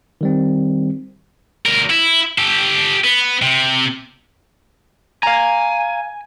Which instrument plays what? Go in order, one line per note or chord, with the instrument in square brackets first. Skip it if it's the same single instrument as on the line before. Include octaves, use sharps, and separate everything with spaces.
[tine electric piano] D#3 G3 C4
[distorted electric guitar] D2 A#4
E4
G4 A4
B3
C3
[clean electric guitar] F5 A#5 [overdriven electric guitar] G#5